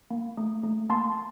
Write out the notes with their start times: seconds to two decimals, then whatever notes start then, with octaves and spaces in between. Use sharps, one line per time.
0.10 A#3
0.37 A3
0.63 A3
0.90 A#3 A5 C6